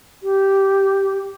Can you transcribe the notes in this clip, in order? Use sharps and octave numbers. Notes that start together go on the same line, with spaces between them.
G4